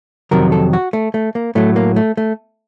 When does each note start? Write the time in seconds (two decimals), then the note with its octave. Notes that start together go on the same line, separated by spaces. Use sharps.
0.31 F2 C3 D#3 F#3 A#4
0.52 A4
0.73 F#4
0.93 A3
1.14 A3
1.35 A#3
1.55 A2 F#3 A3
1.76 A#3
1.96 A3
2.17 A3